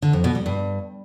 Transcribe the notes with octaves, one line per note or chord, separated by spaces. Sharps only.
D3
F2
B2
G3
G2